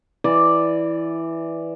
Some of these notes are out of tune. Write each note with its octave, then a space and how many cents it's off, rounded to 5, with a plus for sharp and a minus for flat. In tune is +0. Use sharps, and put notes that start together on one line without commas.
E3 +0 D5 +0